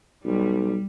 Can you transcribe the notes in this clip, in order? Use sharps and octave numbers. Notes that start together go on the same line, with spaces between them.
B1 G3